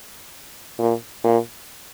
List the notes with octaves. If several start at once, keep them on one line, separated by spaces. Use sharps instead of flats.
A#2
A#2